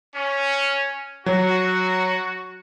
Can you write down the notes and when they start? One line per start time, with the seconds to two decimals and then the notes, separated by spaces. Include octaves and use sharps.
0.15 C#4
1.26 F#3 F#4